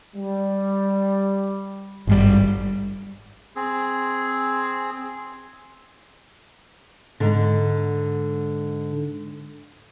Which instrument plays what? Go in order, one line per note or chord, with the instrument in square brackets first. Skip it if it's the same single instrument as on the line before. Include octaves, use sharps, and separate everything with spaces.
[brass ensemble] G3
[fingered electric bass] G#1 G2 G3
[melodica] C4 G#4
[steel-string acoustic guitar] G#2 D3